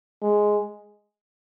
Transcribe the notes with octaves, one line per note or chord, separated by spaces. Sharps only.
G#3